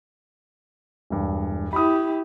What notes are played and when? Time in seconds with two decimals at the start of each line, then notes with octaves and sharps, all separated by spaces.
1.10 E1 G2
1.73 E4 G4 B5 D#6